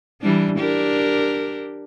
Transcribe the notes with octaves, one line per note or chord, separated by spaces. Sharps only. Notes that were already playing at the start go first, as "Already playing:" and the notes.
E3 G3 D4
D4 G4 A#4